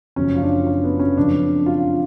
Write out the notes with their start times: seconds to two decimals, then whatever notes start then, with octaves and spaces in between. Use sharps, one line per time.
0.16 F#1 F#2 C#3 F3 C#4
0.35 F4
0.42 D4
0.67 C#4
0.84 B3
1.00 C#4
1.17 F2 C#3 F#3 D4
1.66 F4